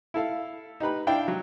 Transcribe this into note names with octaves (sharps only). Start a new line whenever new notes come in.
E4 A4 F5
D#4 G4 B4 B5
D4 E4 F5 G5
F#3